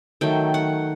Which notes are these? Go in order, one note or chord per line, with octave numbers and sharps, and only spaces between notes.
D#3 F#3 A3 G5
F#5